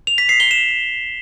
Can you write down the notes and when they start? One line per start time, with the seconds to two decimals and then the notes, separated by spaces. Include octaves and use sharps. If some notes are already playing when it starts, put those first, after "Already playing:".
0.07 F7
0.18 B6
0.29 C7
0.40 G7
0.51 E7